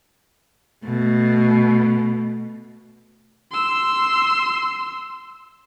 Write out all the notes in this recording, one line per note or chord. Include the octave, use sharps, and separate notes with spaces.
B2 A3
C6 E6